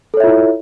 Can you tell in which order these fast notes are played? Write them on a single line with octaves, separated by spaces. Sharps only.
A4 C#5 E5 F4 E4